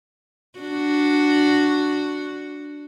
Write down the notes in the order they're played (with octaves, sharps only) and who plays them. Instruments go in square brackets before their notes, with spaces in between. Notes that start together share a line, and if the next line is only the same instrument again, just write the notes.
[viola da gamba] D4 F#4